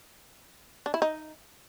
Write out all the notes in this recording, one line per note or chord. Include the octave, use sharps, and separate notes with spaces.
D4
E4
D#4